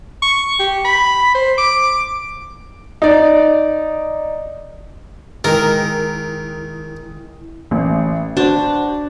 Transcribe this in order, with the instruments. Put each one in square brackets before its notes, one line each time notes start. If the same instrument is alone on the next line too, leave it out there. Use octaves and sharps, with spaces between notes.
[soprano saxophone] C#6
G4
B5
C5
D6
[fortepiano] D#4 D5
[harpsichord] D#3 [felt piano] G#3 G5 [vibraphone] E4 [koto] A#4
[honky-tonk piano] A1
[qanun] D4 [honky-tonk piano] F#4 C5